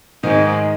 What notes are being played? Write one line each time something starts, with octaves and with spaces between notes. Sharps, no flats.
G#2 D#3 D#4